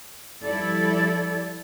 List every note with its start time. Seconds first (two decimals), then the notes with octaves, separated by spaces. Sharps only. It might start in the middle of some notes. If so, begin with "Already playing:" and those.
0.45 F3 G3 E4 A4 D5